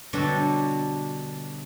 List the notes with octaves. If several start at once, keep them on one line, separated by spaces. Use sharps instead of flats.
B2 D3 F#3 G3 D4 A4